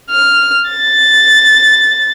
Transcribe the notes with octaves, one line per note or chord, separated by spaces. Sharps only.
F6
A6